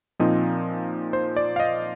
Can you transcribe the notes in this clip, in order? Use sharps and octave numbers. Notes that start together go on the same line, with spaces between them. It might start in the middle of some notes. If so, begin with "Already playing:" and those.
A#2 F3 C4 D#4 D#5
C5
D5
F5
D#5